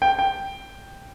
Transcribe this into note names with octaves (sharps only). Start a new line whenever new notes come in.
G5
G5